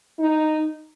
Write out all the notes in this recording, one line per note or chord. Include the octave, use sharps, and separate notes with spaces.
D#4